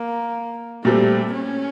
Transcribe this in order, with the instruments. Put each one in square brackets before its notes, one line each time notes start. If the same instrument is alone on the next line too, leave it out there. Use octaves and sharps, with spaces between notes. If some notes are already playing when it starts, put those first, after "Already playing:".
Already playing: [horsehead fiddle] A#3
[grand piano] A#2 G3 C4 [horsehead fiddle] A3
[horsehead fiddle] C#4